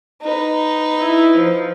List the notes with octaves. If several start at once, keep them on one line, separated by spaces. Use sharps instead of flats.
D#4 B4
E4
F3